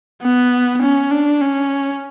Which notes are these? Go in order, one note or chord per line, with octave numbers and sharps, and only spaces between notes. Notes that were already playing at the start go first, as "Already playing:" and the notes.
B3
C#4
D4
C#4